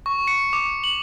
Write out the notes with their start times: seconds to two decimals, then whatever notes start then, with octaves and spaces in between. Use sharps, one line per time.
0.06 C#6
0.27 C#7
0.53 D6
0.84 F#7